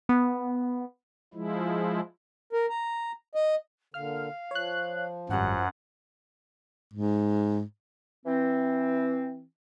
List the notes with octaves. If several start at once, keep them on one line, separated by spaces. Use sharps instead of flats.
B3
F3 G#3 E4
A#4
A#5
D#5
A#2 D3 F5 F6
F3 C#5 F#6
G#1 F#2 G3 F#5
G#2
E3 C4